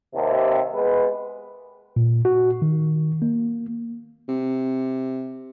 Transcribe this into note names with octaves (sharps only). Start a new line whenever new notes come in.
D#2 C3
G#3 B3 B4
A#2
F#4
D#3
A#3
C3